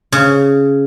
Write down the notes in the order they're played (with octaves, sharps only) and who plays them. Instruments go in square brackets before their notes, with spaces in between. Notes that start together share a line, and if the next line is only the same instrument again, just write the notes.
[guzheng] C#3